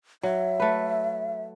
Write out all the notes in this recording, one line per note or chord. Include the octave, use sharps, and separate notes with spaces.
F#3 E5
A3 B4